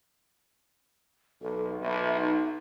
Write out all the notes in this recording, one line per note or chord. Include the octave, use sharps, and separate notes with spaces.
B1 A4
B1 E5
D#4